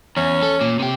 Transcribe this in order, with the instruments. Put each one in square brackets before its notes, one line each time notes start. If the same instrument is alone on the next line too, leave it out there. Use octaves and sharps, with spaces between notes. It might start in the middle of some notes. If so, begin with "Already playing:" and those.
[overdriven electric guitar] E2 [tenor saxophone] C#4
[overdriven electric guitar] A4
A#2
C3 G4